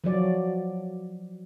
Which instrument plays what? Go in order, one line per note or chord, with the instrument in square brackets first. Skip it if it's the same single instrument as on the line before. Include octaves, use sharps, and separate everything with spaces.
[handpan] F3 F#3 D5